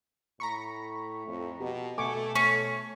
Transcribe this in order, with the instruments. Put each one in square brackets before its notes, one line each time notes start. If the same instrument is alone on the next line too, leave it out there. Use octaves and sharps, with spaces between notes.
[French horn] A2 [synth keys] A#5 B5 C#6
[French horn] F2
[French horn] B2 [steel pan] G4
[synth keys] B2 G#5 [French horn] A3 [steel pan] C#6 D6
[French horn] A3 [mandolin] C#4 [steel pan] C#6